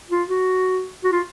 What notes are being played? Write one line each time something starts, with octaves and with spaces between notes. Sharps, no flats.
F4
F#4
F#4
F4